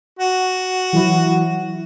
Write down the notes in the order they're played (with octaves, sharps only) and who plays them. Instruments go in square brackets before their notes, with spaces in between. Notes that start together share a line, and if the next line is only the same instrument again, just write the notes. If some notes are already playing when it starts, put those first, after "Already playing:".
[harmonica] F#4
[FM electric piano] E3 F#3 E4